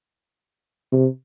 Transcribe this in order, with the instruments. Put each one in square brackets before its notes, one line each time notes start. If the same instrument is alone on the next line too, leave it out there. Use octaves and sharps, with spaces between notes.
[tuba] C3